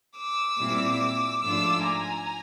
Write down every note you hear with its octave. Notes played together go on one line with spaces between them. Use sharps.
D6 E6
A#2 G3 C4 E4
G#2 F3 A3 D4 F4 D6 E6
G#5 A#5